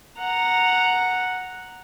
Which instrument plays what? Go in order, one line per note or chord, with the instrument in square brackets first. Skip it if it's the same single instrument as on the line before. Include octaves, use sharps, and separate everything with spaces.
[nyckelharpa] F#5 A#5